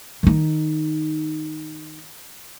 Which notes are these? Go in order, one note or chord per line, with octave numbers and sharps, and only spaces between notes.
D#3 D#4